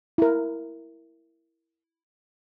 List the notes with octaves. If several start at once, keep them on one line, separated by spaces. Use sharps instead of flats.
E4 A#4